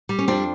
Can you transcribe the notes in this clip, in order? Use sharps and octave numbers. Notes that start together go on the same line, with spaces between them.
G3
C#4
F2 C4 D4